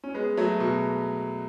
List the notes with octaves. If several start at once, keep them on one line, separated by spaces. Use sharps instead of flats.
C#4
G#3 B3
F#3 A3
B2